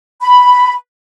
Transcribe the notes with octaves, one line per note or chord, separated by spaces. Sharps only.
B5